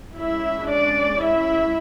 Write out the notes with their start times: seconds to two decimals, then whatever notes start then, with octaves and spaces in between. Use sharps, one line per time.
0.17 G#3 C#4 E4 E5
0.70 D4 D5
1.22 E4 E5